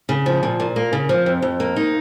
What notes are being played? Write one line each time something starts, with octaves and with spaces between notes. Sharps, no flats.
C#3
F3
A#2
A#2
A#3
C#3
F3
F2
F2
A#3
D#4